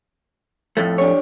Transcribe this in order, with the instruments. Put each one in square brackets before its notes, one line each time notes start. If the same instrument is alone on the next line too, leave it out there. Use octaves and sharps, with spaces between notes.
[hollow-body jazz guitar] F2 A2 A3
[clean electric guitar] D4 G4 C#5